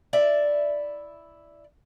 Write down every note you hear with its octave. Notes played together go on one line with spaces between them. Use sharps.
E4 D5 E5